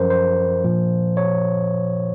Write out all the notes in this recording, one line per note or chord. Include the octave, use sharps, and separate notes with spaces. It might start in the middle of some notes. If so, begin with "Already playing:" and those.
Already playing: F#2 F3 A#4 C5
C5
A#2 F3
C#5